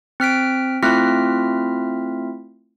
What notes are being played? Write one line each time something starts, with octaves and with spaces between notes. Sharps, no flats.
C4 F6 B6 D7
A3 C4 E4 F4 F6 B6